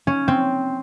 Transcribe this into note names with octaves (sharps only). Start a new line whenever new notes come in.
C#4
C4